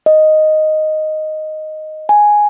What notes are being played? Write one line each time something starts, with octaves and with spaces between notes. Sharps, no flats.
D#5
G#5